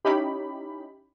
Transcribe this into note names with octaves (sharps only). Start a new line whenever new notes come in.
C#4 D#4 E4 G4 B5